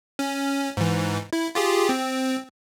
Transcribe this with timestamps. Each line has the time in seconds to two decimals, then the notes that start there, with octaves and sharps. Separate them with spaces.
0.19 C#4
0.77 G#2 E3
1.33 E4
1.55 F4 G4 G#4
1.89 C4